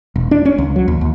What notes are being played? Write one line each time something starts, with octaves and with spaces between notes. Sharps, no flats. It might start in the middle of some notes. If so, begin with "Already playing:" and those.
E1
D4
C#4
C#2
F#3
D#2
D#2